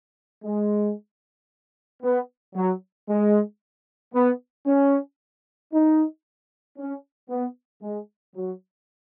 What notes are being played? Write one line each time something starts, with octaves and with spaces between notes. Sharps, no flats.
G#3
B3
F#3
G#3
B3
C#4
D#4
C#4
B3
G#3
F#3